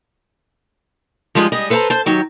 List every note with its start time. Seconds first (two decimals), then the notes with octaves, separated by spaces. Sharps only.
1.35 F3 G3 G#3 F4 D#5
1.52 G3 G#3 D#5
1.70 A4 B4 C5 F5 A5 A#5
1.90 C5 A5
2.06 D#3 F#3 G4